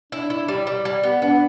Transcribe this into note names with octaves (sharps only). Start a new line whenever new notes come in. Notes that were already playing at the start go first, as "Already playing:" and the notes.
D4 E4
E4
G3
G3
G3
B3
B3 D4